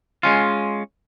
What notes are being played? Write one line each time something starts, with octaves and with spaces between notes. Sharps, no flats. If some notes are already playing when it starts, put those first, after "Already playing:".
G#3 C#4 F4